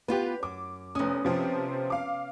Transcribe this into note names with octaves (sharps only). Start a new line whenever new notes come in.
B3 F4 G4 B4
F#2 D6
F1 B3 C#4 D#6
C3 F3 C4
F5 D6